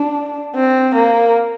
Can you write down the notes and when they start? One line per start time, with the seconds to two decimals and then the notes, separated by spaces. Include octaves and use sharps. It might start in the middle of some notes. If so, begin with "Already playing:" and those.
Already playing: D4
0.55 C4
0.95 A#3